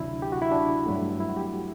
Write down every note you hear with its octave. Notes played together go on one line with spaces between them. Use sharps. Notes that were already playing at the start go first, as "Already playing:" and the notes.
Already playing: D2 C3 F#3 D4 E4
G4
F#4
E4
D4
G2 F#3 A3
E4
F#4
G4